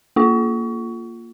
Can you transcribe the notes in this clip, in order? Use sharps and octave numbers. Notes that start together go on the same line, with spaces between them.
A#3 F4